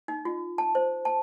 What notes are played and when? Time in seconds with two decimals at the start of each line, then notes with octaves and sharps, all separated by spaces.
0.08 D#4
0.25 F4
0.58 A5
0.75 C5
1.05 A5